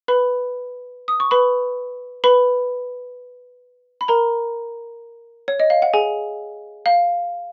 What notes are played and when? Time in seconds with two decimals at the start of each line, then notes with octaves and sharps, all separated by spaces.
0.08 B4 B5
1.08 D#6
1.20 C#6
1.31 B4 B5
2.24 B4 B5
4.01 B5
4.08 A#4 A#5
5.48 C#5
5.60 D#5
5.70 F5
5.82 F#5
5.93 G#4 G#5
6.86 F5